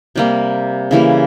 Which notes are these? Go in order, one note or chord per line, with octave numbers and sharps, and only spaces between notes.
C3 G3 A#3
C#3 E3 G3 A#3